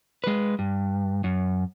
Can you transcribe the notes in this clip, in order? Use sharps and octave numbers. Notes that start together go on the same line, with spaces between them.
G#3 B4
G2
F#2